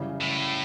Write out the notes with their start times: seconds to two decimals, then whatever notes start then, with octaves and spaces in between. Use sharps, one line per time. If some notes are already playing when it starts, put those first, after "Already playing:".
Already playing: F#2 C#3 E3 G3 C#4
0.21 A2